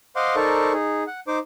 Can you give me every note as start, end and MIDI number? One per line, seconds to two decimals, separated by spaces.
0.16 0.36 72
0.16 0.36 75
0.16 0.36 77
0.16 0.36 78
0.16 0.36 84
0.16 0.36 86
0.36 0.73 63
0.36 0.73 69
0.36 0.73 70
0.36 0.73 72
0.36 0.73 74
0.36 0.73 85
0.73 1.04 63
0.73 1.04 68
1.07 1.20 78
1.28 1.39 63
1.28 1.39 72
1.28 1.39 86